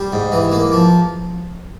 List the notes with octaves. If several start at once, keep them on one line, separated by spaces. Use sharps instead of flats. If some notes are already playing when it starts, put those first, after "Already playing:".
Already playing: G3 C5
G#2
E3
A#3
F3